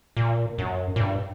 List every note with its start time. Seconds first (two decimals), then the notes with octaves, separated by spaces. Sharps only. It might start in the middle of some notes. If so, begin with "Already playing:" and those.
0.17 A#2
0.58 F#2
0.96 A#2
1.00 G2